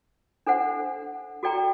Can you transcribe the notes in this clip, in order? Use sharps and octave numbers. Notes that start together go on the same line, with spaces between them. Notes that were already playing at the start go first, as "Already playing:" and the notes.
D4 A4 C5 F#5
F#4 A4 D5 G5 A#5